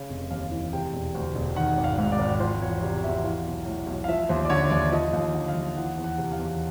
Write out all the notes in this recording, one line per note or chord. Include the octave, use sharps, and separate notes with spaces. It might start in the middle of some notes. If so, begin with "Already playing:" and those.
Already playing: C#3
F1
D#2 F5
E3
C3 G5
E1
D2
E1
D#3 F#5
G#1
F5
G#2
D5
G#1
F3 C5
E2 C#5
C3 D5
E2 E5
E3 F5
B1
A2
B1
F5
F3 E5
D#2 C5
D5
D3 C#5
D#2 D5
F3 D#5
D#2
D3
F5
D#2
E3 F#5
E2
F#5
C3
F5
E2